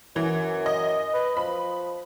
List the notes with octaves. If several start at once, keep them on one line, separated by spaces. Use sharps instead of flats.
F#2 E3
D#5
B4
F3 B5